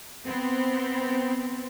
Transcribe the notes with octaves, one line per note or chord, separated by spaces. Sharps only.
B3 C4